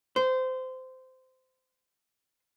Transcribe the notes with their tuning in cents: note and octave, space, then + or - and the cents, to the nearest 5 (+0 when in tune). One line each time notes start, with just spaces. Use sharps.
C5 -20